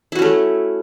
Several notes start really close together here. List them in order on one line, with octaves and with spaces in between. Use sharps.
E4 F#4 C#4 A3